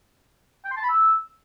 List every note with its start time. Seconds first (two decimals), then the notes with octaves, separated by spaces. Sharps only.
0.65 G5
0.71 C6
0.77 A5
0.83 B5
0.89 E6